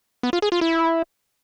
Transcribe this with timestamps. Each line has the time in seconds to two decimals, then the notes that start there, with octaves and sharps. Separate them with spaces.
0.23 B3
0.33 F4
0.42 G#4
0.52 F4
0.61 E4